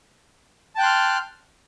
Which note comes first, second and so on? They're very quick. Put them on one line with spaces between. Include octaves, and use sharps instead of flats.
A5 G5 F#6 C6 F6